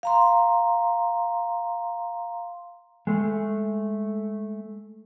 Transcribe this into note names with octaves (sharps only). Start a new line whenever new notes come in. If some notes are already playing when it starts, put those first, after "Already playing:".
F5 A#5 C6
G#3 A3